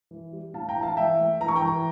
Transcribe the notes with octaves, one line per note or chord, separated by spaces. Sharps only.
E3
G3
A2 F5 A5
G5 A#5
E3
F5 A5
E3 E5 G5
A3
E3 A#5
C#6
G5 A#5
E3